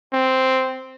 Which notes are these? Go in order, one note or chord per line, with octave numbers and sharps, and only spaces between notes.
C4